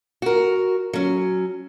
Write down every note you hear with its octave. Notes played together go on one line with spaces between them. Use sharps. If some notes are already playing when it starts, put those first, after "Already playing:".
F#4 A#4
F#3 C#4